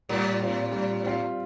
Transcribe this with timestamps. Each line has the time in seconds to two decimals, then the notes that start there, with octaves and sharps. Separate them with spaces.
0.09 A2 G3
0.41 C4 F4
0.72 G3
1.03 C4 F4